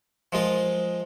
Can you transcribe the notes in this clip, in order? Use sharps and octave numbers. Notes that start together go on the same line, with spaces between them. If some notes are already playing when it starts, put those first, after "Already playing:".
F3 G#3 F4 A#4